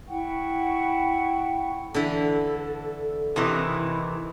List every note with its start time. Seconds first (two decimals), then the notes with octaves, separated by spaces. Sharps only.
0.08 E4 F#5 G5 C#6
1.94 D3 E3 E4 A4
3.36 C3 D#3 E3 E4 D#5